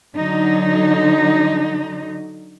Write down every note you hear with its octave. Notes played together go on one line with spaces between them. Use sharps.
D3 F#3 D#4